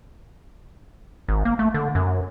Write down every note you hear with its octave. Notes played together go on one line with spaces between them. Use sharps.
G#1
A#3
A3
D3
F#2